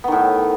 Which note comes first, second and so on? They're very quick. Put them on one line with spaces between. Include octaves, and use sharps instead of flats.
B3 D#3 A2